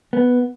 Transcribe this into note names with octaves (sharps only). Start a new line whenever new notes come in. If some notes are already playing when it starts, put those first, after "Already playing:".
B3